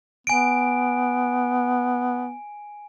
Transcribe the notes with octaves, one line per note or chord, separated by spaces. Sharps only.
B3 G#5 D7